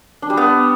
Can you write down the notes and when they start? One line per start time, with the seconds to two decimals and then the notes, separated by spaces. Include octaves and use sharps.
0.22 D4
0.30 G3
0.37 B3